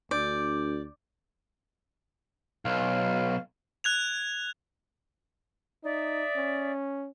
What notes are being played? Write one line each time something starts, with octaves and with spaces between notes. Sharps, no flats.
D2 D4 D5 G6 D7
B1 F5
F#6 G#6 F7
D#4 D5 E5 D#6
C#4